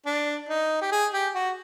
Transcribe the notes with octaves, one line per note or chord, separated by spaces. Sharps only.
D4
D#4
G4
G#4
G4
F#4